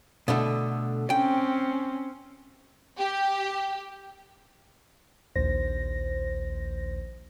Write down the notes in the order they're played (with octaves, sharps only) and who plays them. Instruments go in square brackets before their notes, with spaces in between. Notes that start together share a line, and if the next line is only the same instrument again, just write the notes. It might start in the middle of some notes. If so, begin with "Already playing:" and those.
[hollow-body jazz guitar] B2 D3 A3
[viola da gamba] C4 C#4 [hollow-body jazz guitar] G5
[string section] G4
[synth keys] A#1 D#2 C5 A#6